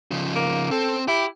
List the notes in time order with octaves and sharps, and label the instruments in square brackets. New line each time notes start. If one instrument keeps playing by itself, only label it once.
[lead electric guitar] C#3 F3
[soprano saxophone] A#3
[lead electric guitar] C4 [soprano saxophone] A4
[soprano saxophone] E4 [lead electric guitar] G4